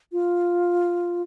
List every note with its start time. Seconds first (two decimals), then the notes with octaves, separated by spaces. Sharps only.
0.12 F4